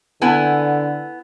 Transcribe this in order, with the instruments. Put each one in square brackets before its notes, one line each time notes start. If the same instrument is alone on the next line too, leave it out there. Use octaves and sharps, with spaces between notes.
[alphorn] D3 [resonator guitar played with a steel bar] B3 E4 G#5